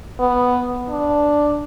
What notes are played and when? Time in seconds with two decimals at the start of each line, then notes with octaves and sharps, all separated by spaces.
0.19 B3
0.89 D4